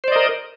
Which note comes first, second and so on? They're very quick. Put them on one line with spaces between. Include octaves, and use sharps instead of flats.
C5 D5 D#5 A#4